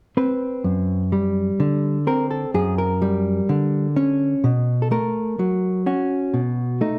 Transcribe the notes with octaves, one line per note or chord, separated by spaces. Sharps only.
C4 B4
F#2
G3
D3
C4 A#4
A4
F#2 G#4
A#4
G3
D3
C#4
B2
A4
A3 A#4
F#3
C#4 F#4
B2
A3 D#4